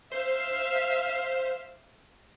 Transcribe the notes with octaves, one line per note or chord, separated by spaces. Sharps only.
C5 E5 F5